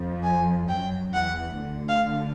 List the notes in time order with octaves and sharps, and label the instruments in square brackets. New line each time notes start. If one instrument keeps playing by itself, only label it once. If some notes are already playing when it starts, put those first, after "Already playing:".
Already playing: [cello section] F2 F3
[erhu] G#5
[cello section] F#2 F#3 [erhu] G5
[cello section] E2 E3 [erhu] F#5
[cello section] D2 D3
[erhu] F5